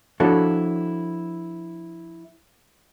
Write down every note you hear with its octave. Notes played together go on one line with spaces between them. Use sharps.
F3 D4 E4 F#4 A4 C#5